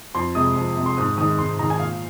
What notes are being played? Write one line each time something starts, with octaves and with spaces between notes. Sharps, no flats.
F2 C6
C3 G#3 D#6
F2
C3 G#3
C6
G#2 D#6
D#3 G#3 D#6
G#2 C6
D#3 G#3 A#5
G#5
A#2 F5